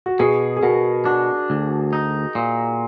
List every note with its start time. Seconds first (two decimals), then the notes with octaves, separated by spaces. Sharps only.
0.06 F#4
0.19 B2 G#4
0.56 G#4
0.62 B2 F#4 A#4
1.05 D4 F#4
1.50 D2
1.93 D#4
2.35 A#2